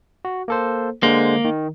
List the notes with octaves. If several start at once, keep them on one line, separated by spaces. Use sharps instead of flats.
F#4
A#3 A4 C5
D3 G#3 A#3 C5
D#3